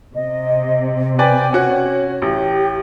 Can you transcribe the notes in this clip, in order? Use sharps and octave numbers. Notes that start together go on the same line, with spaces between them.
C3 D#5
B4 D5 G5 G#5
C#4 F#4 C#5 F#5
A1 G4